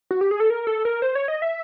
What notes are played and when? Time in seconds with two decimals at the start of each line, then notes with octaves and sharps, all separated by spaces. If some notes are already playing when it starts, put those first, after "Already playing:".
0.11 F#4
0.21 G4
0.31 G#4
0.40 A4
0.50 A#4
0.67 A4
0.85 A#4
1.02 C5
1.15 C#5
1.28 D#5
1.42 E5